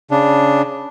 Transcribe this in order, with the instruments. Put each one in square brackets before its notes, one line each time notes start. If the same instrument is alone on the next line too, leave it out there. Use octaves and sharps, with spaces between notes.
[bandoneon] C#3 D4